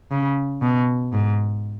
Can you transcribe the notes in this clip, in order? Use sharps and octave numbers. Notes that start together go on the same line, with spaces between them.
C#3
B2
G#2